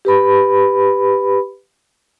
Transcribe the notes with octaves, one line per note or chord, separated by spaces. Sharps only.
G4 B4 B5